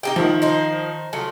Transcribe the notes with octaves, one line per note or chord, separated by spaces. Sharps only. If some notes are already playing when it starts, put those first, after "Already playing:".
D#4 G4 G5
D#3 F3 E4
D#4 C5
F3 F#3 A3